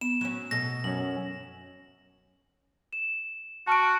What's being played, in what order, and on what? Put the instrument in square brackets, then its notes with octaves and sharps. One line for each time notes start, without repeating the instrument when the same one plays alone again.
[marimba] B3 [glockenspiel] E7
[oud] F#3 C#4
[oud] B2 A4 [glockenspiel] A#6
[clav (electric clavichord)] F#2 C#4 [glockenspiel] F#7
[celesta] E7
[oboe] F#4 [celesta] A5 F6 D7